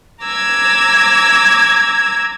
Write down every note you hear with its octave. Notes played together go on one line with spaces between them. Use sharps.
A#5 D6 E6 G#6